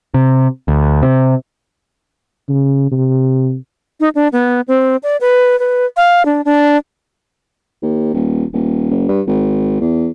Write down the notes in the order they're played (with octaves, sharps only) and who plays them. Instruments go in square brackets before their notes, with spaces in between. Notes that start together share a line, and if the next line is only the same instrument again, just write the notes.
[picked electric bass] C3
D2
C3
[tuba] C#3
C3
[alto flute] D#4
D4
B3
C4
D5
B4
B4
F5
D4
D4
[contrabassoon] D#2
D#1
D#1
F#1
G2
G#1
E2